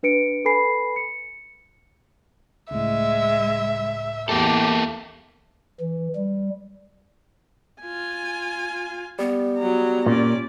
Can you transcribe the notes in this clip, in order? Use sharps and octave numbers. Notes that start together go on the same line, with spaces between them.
D4 B4 C#7 D7
A4 B4 G#5 B5 C7
C#7
C#2 A2 G#3 E5
E2 A#3 G4 A4
E3
G3
F4 G#5
G3 B3
F#3 A#5
A#2 C#4 D5